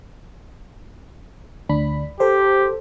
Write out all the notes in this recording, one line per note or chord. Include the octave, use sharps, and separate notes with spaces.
D2 D4 B5
G4 A4 C5